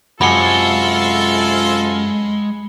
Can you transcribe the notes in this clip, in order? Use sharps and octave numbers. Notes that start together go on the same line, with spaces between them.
F#2 C3 G#3 F4 A4 B5 C#7